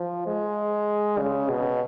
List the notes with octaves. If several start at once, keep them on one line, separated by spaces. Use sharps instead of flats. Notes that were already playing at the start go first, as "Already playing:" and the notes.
Already playing: F3
G#3
C#3
B2